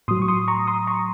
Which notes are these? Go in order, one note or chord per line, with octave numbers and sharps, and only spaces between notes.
A2 F#3 C6 D#6
C#6
C6 D#6
A#5 C#6
C6 D#6
A#5 C#6